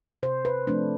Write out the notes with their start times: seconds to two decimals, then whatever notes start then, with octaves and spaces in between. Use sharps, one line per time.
0.23 C3 C5
0.45 B4
0.67 F3 A3 C4 D4